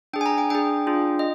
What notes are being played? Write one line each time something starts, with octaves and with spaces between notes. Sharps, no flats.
D4 G#4 G5
G#5
A#5
G5
D4 G#4 G5
D4 F4 G#4
D#5